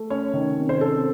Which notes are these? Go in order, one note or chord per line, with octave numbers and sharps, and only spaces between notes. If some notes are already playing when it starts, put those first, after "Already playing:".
Already playing: A3
C#4 C#5
D#3
C3
C5
C#4 A4